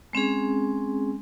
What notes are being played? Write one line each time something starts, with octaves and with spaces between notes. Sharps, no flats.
G#3 C4 C#4 G#4